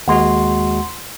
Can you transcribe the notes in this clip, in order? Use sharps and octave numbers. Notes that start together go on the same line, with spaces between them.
D#2 G#3 F#4 F#5 C6